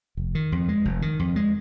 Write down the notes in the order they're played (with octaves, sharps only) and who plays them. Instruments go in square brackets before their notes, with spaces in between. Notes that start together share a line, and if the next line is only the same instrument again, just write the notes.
[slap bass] F1
D#3
F2
G#3
F1
D#3
F2
G#3